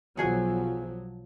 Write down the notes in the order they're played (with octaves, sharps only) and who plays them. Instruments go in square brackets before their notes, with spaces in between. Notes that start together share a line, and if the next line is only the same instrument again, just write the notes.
[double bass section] B1 F3 F#3 [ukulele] F#4 G#4 G#5